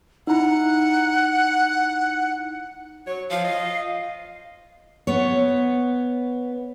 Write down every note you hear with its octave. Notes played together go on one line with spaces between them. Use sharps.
D#4 E4 F#5 A#5
F#3 C#5
F3 F5
F4 D#5
B3 C#5